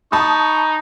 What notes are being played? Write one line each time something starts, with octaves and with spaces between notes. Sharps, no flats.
D#4 A5 B5 C#6 D#6